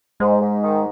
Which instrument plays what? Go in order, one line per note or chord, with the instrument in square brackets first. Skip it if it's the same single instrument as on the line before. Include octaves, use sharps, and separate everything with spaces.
[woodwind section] G#2 [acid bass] G#3
[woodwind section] G#2
D#3